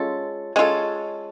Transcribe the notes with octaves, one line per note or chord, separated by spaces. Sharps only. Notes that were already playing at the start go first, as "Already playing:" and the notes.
Already playing: G#3 C#4 F4 A4
G#3 C#4 F4 A4